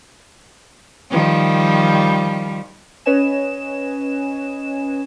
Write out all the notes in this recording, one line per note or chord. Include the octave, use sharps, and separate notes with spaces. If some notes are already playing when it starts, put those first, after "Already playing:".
D#3 F3 G3
C#4 B4 C#5 D#5 G#5 E7